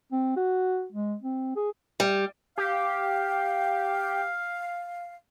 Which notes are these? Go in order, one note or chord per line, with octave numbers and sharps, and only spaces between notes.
C4
F#4
G#3
C4
G#4
G3
G4 F5